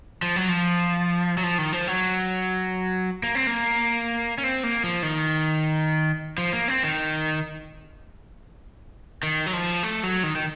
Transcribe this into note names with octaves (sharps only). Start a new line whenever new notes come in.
F3
F#3
F3
F#3
F3
D#3
F3
F#3
A#3
C4
A#3
C#4
C4
A#3
F3
D#3
F3
A#3
C4
D#3
D#3
F#3
F3
A3
F#3
D#3
D#3